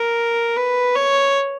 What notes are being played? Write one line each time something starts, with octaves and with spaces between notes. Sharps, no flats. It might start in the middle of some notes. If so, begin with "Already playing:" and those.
Already playing: A#4
B4
C#5